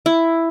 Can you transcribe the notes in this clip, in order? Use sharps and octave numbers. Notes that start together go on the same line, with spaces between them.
E4